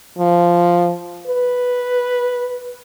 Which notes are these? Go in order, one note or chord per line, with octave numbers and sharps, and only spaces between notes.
F3
B4